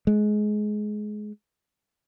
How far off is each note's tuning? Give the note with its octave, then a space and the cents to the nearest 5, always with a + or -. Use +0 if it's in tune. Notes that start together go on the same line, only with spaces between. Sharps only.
G#3 +20